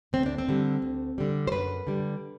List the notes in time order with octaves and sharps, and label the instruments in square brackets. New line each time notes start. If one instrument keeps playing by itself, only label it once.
[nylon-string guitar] D2 C4
D4
C4
D3 G3
D2
D3 G3
C5
F#2 B4
D3 G3